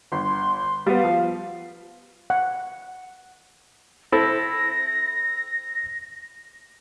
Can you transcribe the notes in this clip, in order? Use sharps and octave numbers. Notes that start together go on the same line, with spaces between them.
G1 C6
G3 B3 F5
F3
F#5
C4 E4 A4 A#6